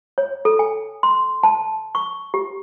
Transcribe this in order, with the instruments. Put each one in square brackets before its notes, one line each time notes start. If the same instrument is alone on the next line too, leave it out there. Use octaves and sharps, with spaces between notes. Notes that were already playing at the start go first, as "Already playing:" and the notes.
[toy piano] C#5
A4
G#5
C6
A5
C#6
G4